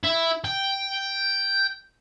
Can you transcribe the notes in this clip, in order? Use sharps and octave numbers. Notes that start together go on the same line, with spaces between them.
E4 E5
G5